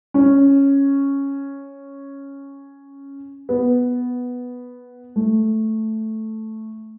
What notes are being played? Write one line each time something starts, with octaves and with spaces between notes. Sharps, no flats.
C#4
B3
A3